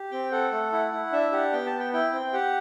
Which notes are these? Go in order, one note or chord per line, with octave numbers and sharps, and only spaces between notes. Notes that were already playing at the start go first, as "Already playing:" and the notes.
Already playing: G4
C4 G5
A4 F#5
A3
E4 F#5
E4
D4 E5
G4 F#5
B3 G5
A5
B3
G5
E4 G5
C4
G4 F#5